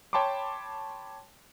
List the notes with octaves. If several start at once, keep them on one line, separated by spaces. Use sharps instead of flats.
C#5 G5 A5 B5 C6 D6